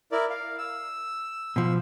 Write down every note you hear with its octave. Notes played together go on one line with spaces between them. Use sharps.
E4 A#4 D5
F5
E6
B2 F3